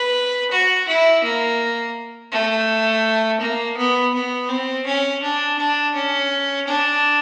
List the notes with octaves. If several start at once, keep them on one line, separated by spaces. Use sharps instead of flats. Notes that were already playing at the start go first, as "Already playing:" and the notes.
Already playing: B4
F#4
E4
A#3
A3
A#3
B3
B3
C4
C#4
D4
D4
C#4
D4